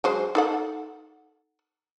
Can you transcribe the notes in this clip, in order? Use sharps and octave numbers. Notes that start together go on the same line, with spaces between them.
F#3 G#3 C5
D#4 A4 F#5